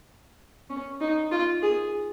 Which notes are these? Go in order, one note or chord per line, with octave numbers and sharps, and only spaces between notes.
C#4
D#4
F4
G#4